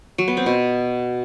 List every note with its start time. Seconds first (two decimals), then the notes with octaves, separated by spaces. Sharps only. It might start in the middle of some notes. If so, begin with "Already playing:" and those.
0.18 F#3
0.28 B3
0.37 C4
0.46 B2